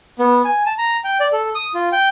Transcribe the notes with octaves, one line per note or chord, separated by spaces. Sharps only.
B3
G#5
A5
A#5
G5
D5
A4
D#6
F4
G5